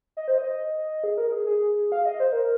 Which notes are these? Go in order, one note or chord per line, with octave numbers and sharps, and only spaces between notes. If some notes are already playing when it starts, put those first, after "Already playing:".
D#5
C5
D#5
G#4
A#4
G#4
G#4
F5
D#5
C5
A#4